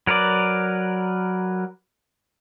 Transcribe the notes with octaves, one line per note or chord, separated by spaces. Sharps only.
F#3 A#4 B4 D5